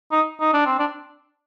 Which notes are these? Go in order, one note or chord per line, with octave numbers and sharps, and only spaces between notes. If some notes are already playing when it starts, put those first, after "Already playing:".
D#4
D#4
D4
C4
D4